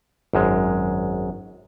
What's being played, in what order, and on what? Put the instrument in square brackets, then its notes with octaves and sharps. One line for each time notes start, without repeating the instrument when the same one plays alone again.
[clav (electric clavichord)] G#1 F#2 G#3